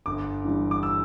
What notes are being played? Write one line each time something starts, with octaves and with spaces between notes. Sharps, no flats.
G1 D6
G2 E3 G3
D6
E6